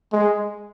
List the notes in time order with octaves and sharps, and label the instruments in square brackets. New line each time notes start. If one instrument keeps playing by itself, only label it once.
[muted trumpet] G#3